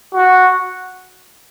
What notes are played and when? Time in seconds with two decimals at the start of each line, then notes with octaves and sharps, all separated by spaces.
0.14 F#4